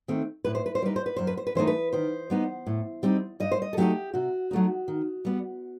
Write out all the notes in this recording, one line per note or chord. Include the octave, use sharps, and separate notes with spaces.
D#3 A3 C4
A2 B4
C5
B4
C5
G3 D#4 B4
C5
B4
F#2 C5
B4
C5
B4
E3 A3 D#4 C5
B4
D#3 C5
G3 B3 D#4
A2
G3 C4 D#4
G2 D#5
C5
D#5
A4
F#3 A3 C4 D#4 G4
C3 F#4
F#3 A3 D#4
D#3
G3 B3